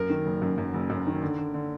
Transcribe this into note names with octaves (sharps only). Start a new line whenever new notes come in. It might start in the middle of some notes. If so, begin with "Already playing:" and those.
Already playing: F#2 A#4
D#3
F#1
F#2
F#2
F#1
F#2
D#3
D3
D3
D3